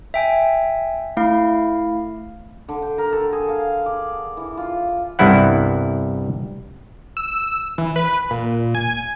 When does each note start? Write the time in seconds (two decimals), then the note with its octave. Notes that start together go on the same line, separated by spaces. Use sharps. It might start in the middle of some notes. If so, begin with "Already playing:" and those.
0.14 E5 G5 G#5
1.17 A3 E4 F5
2.68 D3
2.82 G5
2.98 A#4
3.12 A4
3.33 G#4
3.49 F5
3.86 D5
4.37 E3
4.57 F4
5.19 C2 G2 B3 E4 F#5
7.17 E6
7.78 E3
7.96 B4
8.31 A#2
8.75 G#5